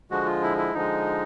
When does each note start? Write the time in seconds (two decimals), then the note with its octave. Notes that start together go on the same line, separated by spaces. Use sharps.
0.11 D3 F3 G#3 F#4
0.26 F4
0.43 E4
0.57 E4
0.74 D3 F3 G#3 D#4